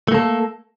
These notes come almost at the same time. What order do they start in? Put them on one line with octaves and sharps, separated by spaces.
A3 A#3 A4